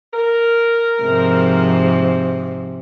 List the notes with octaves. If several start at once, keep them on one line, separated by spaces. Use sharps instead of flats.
A#4
G#2 C3 F3